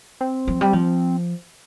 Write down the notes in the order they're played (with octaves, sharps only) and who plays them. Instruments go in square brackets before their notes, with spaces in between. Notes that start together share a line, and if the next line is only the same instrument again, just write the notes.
[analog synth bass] C4
[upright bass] F3
G3
F3